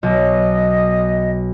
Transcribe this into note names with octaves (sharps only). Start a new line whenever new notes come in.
B1 D#5